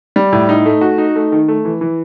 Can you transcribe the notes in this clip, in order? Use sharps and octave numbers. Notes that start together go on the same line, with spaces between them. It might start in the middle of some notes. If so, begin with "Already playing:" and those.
G3
A2
D#4
A3
F#4
D#4
A3
D#3
A3
E3
E3